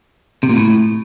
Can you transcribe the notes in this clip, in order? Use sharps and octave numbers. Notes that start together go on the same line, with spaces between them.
C3
A#2
A2